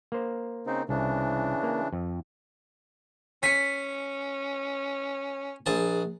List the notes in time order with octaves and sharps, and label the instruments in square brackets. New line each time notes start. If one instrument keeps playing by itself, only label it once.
[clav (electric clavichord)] A#3 C5
[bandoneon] C#3 C4 D#4
[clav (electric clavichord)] C2 [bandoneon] C#3 E3 D4
[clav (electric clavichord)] A#3
F2
[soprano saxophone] C#4 [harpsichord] G#5 [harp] B6 C#7
[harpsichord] A#1 G#4 A5